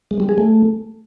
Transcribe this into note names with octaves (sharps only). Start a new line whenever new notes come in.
G#3
G3
G#4
A3